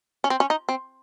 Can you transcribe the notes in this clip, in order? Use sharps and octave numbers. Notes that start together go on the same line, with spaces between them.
C#4
C4
C#4
D#4
C4